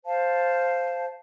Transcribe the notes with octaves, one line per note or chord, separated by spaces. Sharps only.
C5 F5 A5